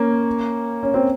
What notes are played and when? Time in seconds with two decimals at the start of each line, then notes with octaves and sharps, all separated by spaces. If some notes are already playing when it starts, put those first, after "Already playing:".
Already playing: A#3 C#4
0.83 C#4
0.94 C4